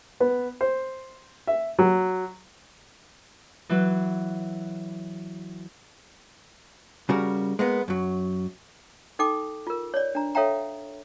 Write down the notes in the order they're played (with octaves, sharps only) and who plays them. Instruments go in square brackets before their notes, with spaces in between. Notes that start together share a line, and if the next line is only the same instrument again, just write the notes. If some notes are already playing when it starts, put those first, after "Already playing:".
[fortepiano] B3
C5
E5
F#3
[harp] E3 F#3
[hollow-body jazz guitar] C#3 G3 F#4 A#4
G#3 A#3 B3
F#2 F#3
[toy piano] D#4 A4 G5 D6
F4 A#4
C#5 D5
D4 A#5
A4 C#5 E5 F5 G5 A#5